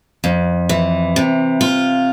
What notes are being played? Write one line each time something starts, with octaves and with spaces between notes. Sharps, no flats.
F2
E3
C3
F4